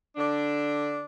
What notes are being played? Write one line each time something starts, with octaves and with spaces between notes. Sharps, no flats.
D3 D4